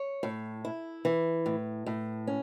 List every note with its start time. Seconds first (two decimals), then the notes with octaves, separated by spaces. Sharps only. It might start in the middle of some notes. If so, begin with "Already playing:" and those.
Already playing: C#5
0.23 A2
0.65 E4
1.05 E3
1.46 A2
1.86 A2
2.27 C#4